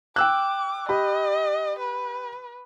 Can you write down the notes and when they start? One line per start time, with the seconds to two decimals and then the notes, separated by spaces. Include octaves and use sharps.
0.16 G5 D6 E6 F#6
0.89 G4 D#5 B5
1.79 B4